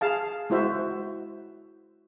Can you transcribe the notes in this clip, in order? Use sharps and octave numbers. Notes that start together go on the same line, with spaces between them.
G#4 F5 A5
G#3 E4 F#4 C5 E5